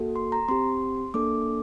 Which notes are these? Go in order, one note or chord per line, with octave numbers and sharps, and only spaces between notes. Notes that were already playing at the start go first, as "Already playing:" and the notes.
Already playing: A#3 F#4 A4
C6
A#5
C4 G4 C6
A#3 D4 A4 D6